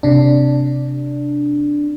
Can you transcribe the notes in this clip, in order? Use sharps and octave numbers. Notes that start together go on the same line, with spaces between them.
C3 D4